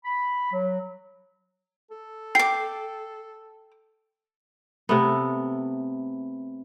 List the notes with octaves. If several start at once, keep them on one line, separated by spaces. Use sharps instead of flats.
B5
F#3
A4
G5 D6 C7
C3 A3 B3